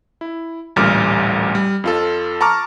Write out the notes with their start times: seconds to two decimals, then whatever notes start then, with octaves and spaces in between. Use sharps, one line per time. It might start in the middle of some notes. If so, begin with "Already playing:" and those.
0.21 E4
0.76 A1 D2 A#2 G3 D6 F6
1.55 G3
1.84 F2 F4 A4
2.41 A5 A#5 C#6 D6 F6